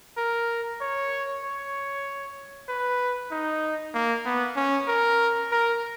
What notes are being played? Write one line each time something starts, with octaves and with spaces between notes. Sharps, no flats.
A#4
C#5
C#5
B4
D#4
A#3
B3
C#4
A#4
A#4